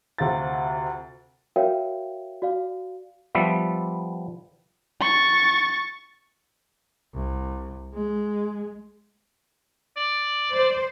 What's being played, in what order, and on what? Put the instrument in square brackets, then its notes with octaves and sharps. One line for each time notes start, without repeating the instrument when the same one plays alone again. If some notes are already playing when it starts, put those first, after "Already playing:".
[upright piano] D2 C3 F4 A6
[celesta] F#4 A#4 C#5 E5 F5 G5
F#4 D5 F5
[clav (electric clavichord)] F3 G3 B3 E5
[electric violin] C#6 A6
[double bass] C2
G#3
[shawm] D5
[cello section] C5